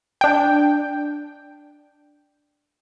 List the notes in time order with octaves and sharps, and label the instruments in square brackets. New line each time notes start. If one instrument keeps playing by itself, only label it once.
[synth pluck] D4 G5